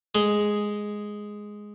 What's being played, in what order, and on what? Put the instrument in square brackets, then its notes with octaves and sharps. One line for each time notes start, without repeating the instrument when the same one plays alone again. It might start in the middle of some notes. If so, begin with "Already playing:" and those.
[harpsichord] G#3